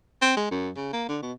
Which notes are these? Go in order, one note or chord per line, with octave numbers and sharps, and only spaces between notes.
C4
G#3
F#2
C#3
A#3
D3
B2